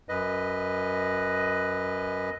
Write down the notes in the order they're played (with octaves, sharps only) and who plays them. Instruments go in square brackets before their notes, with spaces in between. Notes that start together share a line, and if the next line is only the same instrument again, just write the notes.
[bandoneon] F#2 B4 D#5